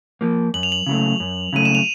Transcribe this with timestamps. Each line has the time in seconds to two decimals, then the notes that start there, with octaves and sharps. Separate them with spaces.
0.21 F3 A#3
0.54 F#2 F#7
0.63 F7
0.72 F#7
0.86 C#3 F#3 A3
1.20 F#2
1.53 C#3 F#3 A3 D#7
1.65 E7
1.75 F7